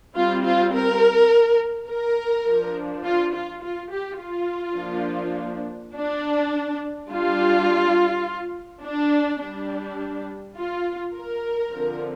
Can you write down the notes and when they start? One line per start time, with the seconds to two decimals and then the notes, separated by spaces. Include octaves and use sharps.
0.15 G3 C4 F4
0.44 F4
0.74 A#4
1.89 A#4
2.47 F3 D4
3.05 F4
3.34 F4
3.63 F4
3.92 G4
4.21 F4
4.78 F3 A#3 D4
5.94 D4
7.10 G3 D4 F4
8.84 D4
9.41 G3 D4
10.58 F4
11.15 A#4
11.73 D3 F3 C4